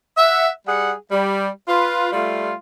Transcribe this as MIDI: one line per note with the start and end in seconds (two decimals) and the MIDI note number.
0.17 0.49 76
0.17 0.49 78
0.66 0.93 55
0.66 0.93 68
0.66 0.93 78
1.11 1.47 55
1.68 2.12 65
1.68 2.12 71
2.13 2.52 55
2.13 2.52 57
2.13 2.52 65